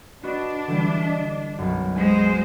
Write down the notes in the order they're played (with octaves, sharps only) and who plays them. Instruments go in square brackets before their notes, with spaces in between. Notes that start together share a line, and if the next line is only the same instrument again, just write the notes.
[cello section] D4 [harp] F#4 B4 D#5
[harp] D3 E3 G3
D#5 A5
B1 F#2
[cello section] G#3 C5 [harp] G#5